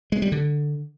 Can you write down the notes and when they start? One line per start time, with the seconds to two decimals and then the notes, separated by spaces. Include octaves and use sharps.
0.12 G#3
0.22 G3
0.32 D3